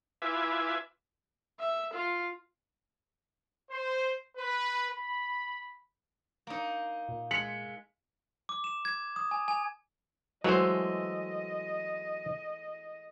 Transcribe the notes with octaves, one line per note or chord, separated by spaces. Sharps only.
E4 F4 B4 E5 G#5 D6
E5
F4
C5
B4
B5
A#3 D#4
A#2
G#3 B6 C#7 F#7
D6
E7
G#6
D#6
G#5
G#5
E3 F#3 G#3 A3 C5 D#5